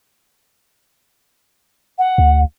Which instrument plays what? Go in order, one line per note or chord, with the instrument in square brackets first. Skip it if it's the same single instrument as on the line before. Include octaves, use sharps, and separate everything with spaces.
[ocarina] F#5
[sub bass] D2